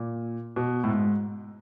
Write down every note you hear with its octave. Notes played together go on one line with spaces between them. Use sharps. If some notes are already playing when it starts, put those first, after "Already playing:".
Already playing: A#2
B2
A2
G#2